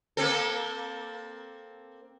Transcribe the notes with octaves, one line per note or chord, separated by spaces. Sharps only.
A#3 C4 A4